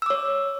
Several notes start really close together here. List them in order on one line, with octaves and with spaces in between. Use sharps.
E6 D6 C#5